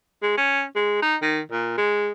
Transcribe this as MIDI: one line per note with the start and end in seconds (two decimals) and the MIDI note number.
0.22 0.34 56
0.37 0.63 61
0.76 1.01 56
1.02 1.16 63
1.22 1.41 51
1.52 1.76 46
1.78 2.11 56